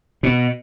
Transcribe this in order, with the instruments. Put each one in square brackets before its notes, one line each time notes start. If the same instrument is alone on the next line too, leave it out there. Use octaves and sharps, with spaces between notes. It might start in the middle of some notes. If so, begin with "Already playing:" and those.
[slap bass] B2